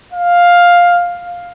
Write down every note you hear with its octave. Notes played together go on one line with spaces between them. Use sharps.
F5